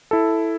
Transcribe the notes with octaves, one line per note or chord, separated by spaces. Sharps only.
E4 A4